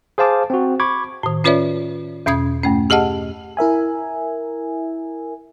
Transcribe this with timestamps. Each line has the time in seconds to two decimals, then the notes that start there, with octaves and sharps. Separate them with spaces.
0.18 G#4 C5 F5 A5 D6
0.50 C4 F#4
0.80 B5 C#6 D6 G#6
1.23 A2 D#3
1.44 C#4 F4 B4 C#5 D5 E5
2.26 E2 B2 C#4 D#6 G#6
2.63 G2 A3 C#4
2.90 G4 G#4 D#5 F#5 A5
3.57 E4 A#4 E5 G#5